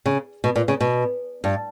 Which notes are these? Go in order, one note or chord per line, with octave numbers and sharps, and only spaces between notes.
C#3
B2
A#2
C#3
B2
G2